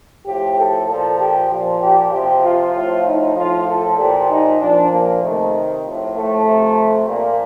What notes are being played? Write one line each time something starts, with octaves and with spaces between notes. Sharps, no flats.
A2 F3 G4
A4
A#2 F3 A4
G4
A#2 F3
G4
C3 F3 G4
F4
A2 F3
D#4
A2 F3 F4
A4
A#2 F3 G4
D#4
A#2 F3 D4
A#3
C3 D#3 A3
A2 F3
A3
C3 F3
A#2 F3 A#3